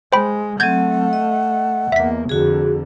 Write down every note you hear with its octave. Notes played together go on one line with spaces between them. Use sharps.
G#3 C5 G5 B5
F#3 A3 C4 F#5 G6 G#6
D#5
E2 A#3 E5 B6
F2 D3 F#4 G#4